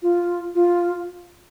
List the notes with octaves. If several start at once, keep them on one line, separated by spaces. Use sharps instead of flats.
F4
F4